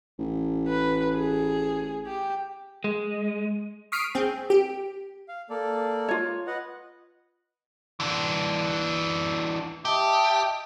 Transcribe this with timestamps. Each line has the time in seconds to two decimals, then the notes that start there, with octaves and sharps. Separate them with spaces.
0.19 A1
0.68 B4
1.17 G#4
2.07 G4
2.84 G#3
3.92 C#6 D#6 F6 B6 C7 D7
4.15 C4 G#4
4.50 G4
5.28 F5
5.50 A#3 A4 D5
6.08 F4 C#5
6.47 B4 D#5 F#5
8.00 E3 D4
9.85 G4 D#5 E5 A5